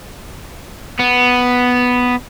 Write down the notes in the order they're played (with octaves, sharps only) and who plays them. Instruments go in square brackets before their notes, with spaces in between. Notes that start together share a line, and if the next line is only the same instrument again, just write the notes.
[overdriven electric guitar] B3